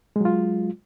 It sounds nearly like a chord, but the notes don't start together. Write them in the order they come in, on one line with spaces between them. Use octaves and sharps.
G#3 F#3 F4